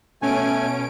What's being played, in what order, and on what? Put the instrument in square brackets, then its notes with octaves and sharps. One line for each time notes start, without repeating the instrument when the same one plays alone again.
[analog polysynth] B2 C#4 D7 [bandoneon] A3 G#5